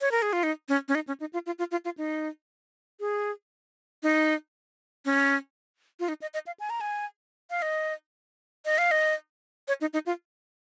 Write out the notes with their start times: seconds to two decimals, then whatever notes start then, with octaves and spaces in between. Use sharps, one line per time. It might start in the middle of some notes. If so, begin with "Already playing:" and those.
0.01 C#5
0.11 A#4
0.22 G#4
0.33 F4
0.43 D#4
0.69 C#4
0.88 C#4
0.95 D#4
1.08 C#4
1.20 D#4
1.33 F4
1.46 F4
1.59 F4
1.71 F4
1.85 F4
1.98 D#4
3.00 G#4
4.03 D#4
5.05 C#4
6.00 F4
6.09 D#4
6.22 D#5
6.34 D#5
6.47 F5
6.60 G#5
6.70 A#5
6.81 G#5
7.50 F5
7.62 D#5
8.65 D#5
8.78 F5
8.91 D#5
9.68 C#5
9.81 D#4
9.93 D#4
10.06 F4